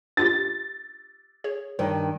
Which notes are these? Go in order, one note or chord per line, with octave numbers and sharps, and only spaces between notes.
D4 F4 G4 A6
G#4 C#5
G2 D#3